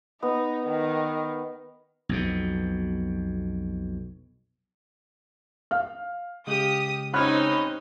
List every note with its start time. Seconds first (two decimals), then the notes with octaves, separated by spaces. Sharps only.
0.23 B3 D#4
0.67 D#3
2.09 B1 F2 B2
5.71 F5 F6
6.47 C#3 G#3 G4 D#6
7.14 C4 C#4 D#4 C#5 D#5 B5 F6 F#6